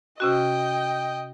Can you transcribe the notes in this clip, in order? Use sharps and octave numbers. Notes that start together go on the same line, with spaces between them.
C3 C#4 F#4 D#5 G5